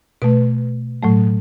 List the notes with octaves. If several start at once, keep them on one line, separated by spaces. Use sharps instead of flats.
B2 A3 B4
A2 F#3 A3